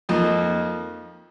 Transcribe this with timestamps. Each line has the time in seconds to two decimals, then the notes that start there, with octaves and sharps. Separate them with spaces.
0.09 F2 F3 A#3 D#4 D#5